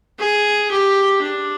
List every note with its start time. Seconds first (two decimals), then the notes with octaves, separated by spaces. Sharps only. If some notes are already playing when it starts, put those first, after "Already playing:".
0.19 G#4
0.71 G4
1.23 D4